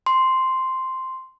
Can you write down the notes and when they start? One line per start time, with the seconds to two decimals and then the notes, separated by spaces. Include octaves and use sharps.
0.07 C6